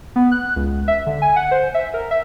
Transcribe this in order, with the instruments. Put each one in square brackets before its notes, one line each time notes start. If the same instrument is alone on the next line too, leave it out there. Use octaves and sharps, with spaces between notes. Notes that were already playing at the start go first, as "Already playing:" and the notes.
[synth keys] B3
F#6
C#2
E5
D3
G#5
F#5
C5
E5
A#4
E5